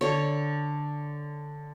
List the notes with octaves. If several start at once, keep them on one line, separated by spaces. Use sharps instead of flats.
D3 C#5